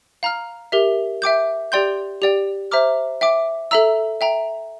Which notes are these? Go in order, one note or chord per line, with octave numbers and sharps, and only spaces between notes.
F5 A#5 F6
G4 A#4 E5
E5 G5 D6 G6
G4 D5 G5 C6 G6
G4 D5 G5
C5 E5 A#5 D6 F6
E5 G5 D6
A4 E5 A#5 E6
E5 G5 A#5